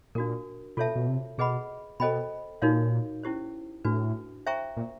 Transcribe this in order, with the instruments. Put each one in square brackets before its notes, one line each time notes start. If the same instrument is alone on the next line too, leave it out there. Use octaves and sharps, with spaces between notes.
[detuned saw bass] A#2 [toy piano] D4 F#4 A#4
[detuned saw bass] B2 [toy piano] F4 A4 C#5 E5 A5
[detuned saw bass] B2
C3
[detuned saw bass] B2 [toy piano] G#4 B4 D#5 F#5 B5
[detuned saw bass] B2 [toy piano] A4 C5 D#5 G5 B5
[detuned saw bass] A#2 [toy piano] D#4 F#4 A#4 C#5 F5
[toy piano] C#4 E4 G4 C5
[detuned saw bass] A2 [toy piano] D4 F#4 B4
[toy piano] C5 E5 G5 A#5 C#6
[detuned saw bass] A#2